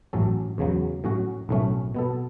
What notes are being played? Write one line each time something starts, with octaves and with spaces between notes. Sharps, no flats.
A1 A2 F#3 C#4 A4
E2 C#3 F#3
A2 F#3 C#4 F#4
B1 A2 A3 C#4
B2 B3 A4